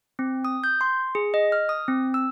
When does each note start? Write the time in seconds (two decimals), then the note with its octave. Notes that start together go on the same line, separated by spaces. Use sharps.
0.19 C4
0.45 D#6
0.64 G6
0.81 C6
1.15 G#4
1.34 D#5
1.52 F6
1.69 D#6
1.88 C4
2.14 E6